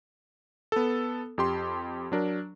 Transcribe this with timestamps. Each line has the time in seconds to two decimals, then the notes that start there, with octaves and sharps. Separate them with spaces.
0.72 B3 A4
1.38 F2 G4 C6
2.12 F#3 D4 A#4